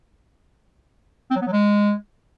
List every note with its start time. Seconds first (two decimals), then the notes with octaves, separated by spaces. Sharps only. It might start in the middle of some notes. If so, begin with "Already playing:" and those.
1.31 C4
1.36 F#3
1.42 B3
1.47 F#3
1.53 G#3